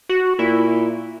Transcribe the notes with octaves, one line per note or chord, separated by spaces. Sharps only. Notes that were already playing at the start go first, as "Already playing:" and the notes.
F#4
A#2 E4